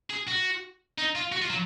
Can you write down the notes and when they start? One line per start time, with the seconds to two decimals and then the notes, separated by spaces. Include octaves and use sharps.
0.10 G#4
0.28 F#4
0.98 D#4
1.15 F4
1.32 F#4
1.42 F4
1.50 F#3